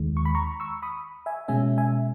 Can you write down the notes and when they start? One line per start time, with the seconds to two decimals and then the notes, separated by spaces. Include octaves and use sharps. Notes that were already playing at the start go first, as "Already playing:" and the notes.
Already playing: D#2 D#3 G#3
0.17 C#6
0.25 B5
0.35 A#5 C#6
0.60 C#6 E6
0.82 B5 D#6
1.26 E5 G#5
1.48 B2 G#3 C#4 E5 G#5
1.78 E5 G#5